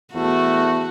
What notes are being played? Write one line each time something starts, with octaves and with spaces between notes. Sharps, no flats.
E2 A3 F#4